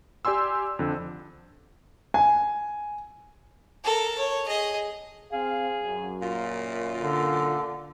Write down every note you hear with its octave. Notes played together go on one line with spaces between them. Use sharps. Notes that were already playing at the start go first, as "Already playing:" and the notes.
G4 D5 G#5 C6 E6
F2 D3
G#5
A4 A#4
C#5
G#4 D#5
C4 G#4 F5
F#2
A#2 F4
D3